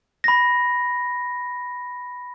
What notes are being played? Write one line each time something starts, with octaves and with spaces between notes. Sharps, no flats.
B5 A#6